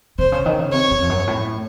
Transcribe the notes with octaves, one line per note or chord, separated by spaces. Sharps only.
C3 C5
C#3
D#3
C#3
C3 C#5
F#2
F2
F#2
A2